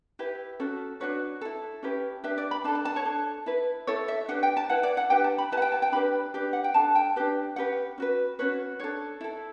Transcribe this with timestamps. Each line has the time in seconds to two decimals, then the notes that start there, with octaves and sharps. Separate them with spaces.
0.19 E4 G4 B4
0.60 C#4 F#4 A4
1.00 D4 F#4 B4 C#5
1.41 E4 A4
1.83 C#4 E4 G4 B4
2.24 D4 G4 B4 E5
2.38 D5
2.51 B5
2.64 D4 A5
2.68 A4
2.75 A5
2.85 A5
2.96 C#5
3.05 D4 A4
3.46 E4 B4
3.87 E4 A4 C#5
4.08 E5
4.28 D4 G4 B4 F#5
4.43 G5
4.57 A5
4.69 E4 B4 F#5
4.83 D5
4.97 F#5
5.10 D4 G4 B4 G5
5.24 A5
5.38 B5
5.52 E4 G4 B4 A5
5.57 F#5
5.62 G5
5.72 A5
5.82 G5
5.92 D4 G4 B4 B5
6.34 D4 G4 B4
6.53 F#5
6.64 G5
6.74 D4 A4 A5
6.95 G5
7.16 D4 G4 B4
7.56 C#4 G4 B4 F#5
7.98 C#4 F#4 B4
8.39 C#4 F#4 B4 C#5
8.80 D4 A4 C#5
9.21 E4 A4